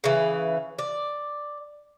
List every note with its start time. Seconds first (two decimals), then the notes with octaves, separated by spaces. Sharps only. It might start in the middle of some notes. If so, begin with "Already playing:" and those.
0.04 C#3 E3
0.79 D5